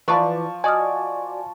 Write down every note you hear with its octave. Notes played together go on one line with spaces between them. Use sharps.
E3 F3 B4 D5 C#6
F#4 D5 D#5 G#5 D#6 F6